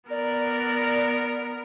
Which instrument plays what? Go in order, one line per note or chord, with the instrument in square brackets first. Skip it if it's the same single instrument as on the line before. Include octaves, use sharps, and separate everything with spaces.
[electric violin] B3 A#4 [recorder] D5